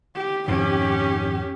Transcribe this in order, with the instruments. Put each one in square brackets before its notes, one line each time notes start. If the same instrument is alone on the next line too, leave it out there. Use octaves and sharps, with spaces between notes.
[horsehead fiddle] G4
[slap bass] F2 G#2 D#3 [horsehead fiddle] C#4 G4